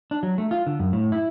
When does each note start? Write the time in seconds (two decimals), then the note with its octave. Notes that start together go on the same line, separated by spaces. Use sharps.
0.11 D4
0.23 F#3
0.38 A3
0.51 F4
0.67 D3
0.79 F#2
0.93 A2
1.12 E4